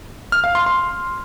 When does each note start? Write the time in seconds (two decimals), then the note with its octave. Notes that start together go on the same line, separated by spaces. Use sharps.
0.32 F6
0.44 F5
0.55 C6
0.66 C6